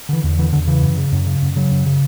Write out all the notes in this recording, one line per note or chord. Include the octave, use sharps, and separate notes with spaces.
D3 E3
E2
D3 E3
E2 D3
C#3 E3
F#2
C#3
F#2
C#3
F#2
C#3 F#3
F#2
C#3